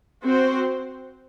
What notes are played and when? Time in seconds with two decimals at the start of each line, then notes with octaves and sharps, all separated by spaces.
0.24 C4 F#4 C5